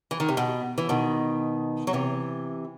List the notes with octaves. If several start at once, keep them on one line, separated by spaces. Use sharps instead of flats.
E3
D#3
C3
B2
E3
B2 D#3
F#3
C3 E3